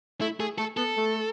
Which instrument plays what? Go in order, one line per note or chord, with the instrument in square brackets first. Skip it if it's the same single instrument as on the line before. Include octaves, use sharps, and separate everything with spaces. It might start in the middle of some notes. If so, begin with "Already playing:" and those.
[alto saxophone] A3 [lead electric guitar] E4
[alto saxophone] A3 [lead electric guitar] G#4
[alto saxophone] A3 [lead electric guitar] A4
[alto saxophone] B3 [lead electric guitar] A4
[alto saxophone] A3